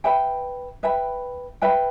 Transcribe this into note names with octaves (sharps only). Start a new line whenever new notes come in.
B4 E5 G5 B5
B4 E5 G5 B5
B4 E5 G5 B5